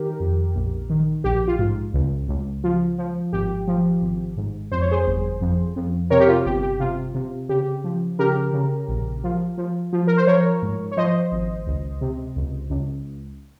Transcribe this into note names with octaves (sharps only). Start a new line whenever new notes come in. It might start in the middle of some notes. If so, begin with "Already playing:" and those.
Already playing: D#3 G4 A#4
F2
A#1
D#3
A#1 G4
F4
G#2
C#2
C#2
F3
F3
G#1 G4
F3
G#1
G#2
F2 C5
C#5
G#4 C5
G1
F2
F2
C3 A#4 C#5
G4
F4
G1 G4
G4
C3 F4
C3
C#3 G4
F3
C#3 G4 A#4
C#3
A#1
F3
F3
F3
A#4
C5
F3 A#4 C#5
G#2
C#5
F3 C5 D#5
G#1
C#2
C3
C#2
C#2